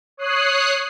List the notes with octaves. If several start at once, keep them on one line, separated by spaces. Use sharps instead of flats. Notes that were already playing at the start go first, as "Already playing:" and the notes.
C#5 D#6 F#6 C7